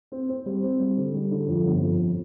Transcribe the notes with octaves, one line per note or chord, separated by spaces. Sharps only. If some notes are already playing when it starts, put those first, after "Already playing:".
C4
C4
G3
C4
G3
D3
G3
D3
F2
G1
F2